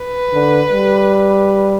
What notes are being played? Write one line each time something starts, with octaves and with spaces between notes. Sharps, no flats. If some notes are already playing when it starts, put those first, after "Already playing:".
Already playing: B4
D3
G3